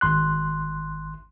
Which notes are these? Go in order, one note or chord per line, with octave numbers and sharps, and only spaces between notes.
G#1 C6 F#6